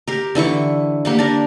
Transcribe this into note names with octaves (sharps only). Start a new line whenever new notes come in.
G4 A#4
D3 E3 E4 C#6
A#3 G4 F#5
D4 A#4